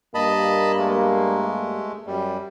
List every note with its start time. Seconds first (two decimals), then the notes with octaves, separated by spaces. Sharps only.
0.15 G2 A#3 D#5 A5 B5
0.77 G#3 A3
2.07 F#2 G3